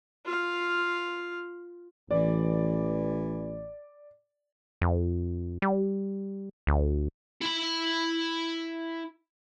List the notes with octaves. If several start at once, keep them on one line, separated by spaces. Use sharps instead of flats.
F4 F5
A1 E3 D5
F2
G3
D2
E4 B5